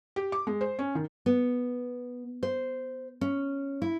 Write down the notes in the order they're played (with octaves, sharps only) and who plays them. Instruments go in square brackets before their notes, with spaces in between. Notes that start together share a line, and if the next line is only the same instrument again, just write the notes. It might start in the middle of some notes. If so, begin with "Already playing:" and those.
[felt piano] G4
D6
G#3
C5
C#4
D#3
[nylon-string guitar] B3
C5
C#4
E4